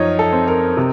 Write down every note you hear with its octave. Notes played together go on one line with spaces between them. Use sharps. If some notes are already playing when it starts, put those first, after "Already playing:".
Already playing: F#2 F3 D#4 C#5
A4
C4
A#4
C3